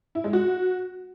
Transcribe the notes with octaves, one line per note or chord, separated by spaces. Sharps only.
E4
G#3
F#4